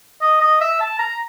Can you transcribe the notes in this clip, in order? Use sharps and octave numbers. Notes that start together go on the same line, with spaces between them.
D#5
D#5
E5
A5
A#5